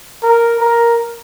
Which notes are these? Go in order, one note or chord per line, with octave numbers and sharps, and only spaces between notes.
A#4
A#4